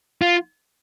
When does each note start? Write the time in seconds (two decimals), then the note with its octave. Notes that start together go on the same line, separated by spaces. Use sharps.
0.22 F4